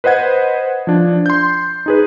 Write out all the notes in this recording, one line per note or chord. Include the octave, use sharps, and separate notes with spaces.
B4 C5 D#5 F#5 G#6
F3 D4
C6 G6
D#4 G#4 B4